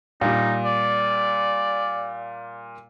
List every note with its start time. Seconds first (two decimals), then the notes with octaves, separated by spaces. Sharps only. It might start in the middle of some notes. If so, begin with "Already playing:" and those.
0.21 A#2 G3 D#4
0.65 D5